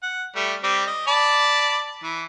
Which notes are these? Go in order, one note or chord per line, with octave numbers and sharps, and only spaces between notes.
F#5
G3 A3
G3 C4 D6
D#5
D5 A5 B5
E3